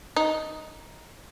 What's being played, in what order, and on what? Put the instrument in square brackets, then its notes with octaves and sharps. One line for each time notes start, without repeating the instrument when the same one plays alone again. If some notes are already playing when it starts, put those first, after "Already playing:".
[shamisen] D#4